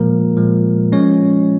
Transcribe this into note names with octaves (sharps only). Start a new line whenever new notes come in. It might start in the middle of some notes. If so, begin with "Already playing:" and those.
Already playing: A#2 F3 G#3 A#3 A#4
A#2 F3 G#3
F3 G#3 C#4 C#5